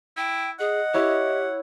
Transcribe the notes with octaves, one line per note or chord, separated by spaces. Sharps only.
E4 G5
G#4 D#5 F#5
E4 G4 C#5